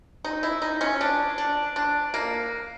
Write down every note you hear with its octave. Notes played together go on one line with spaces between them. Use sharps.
D#4
E4
D#4
C#4
D4
D4
D4
A#3